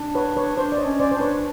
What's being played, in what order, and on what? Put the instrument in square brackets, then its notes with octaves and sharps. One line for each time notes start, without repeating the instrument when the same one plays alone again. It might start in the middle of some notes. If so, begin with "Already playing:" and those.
Already playing: [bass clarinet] D4
[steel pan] B4 C#5
B4 C#5
[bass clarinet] D4 [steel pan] C5
[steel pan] D5
C#5 D#5
[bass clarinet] C#4
[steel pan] C5 D5
[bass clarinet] D4 [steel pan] C5
[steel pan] B4 C#5